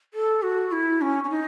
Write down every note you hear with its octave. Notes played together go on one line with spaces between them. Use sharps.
A4
F#4
E4
C#4
C#4
D#4